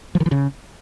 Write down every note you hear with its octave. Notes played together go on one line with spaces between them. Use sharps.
F3
D#3
E3
C#3